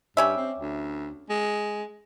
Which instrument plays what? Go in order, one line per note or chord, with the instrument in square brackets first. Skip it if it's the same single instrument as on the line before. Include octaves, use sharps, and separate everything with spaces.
[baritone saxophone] G2 [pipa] G3 C#4 E5
[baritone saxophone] C4
D2
G#3